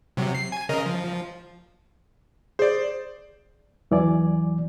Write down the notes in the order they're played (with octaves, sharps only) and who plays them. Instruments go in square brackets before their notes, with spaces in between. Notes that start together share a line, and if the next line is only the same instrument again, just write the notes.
[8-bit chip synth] C3 F#3
C7
G#5
C#3 A#4 D#5
F3
[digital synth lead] G#4 [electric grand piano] C5 D5
[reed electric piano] E2 E3 F#3 D5 G#5